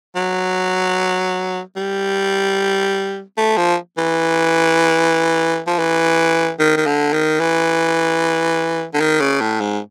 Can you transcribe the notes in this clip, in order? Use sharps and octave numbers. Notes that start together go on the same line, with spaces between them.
F#3
G3
A3
F3
E3
F3
E3
D#3
D#3
D3
D#3
E3
D3
D#3
C#3
A2
G#2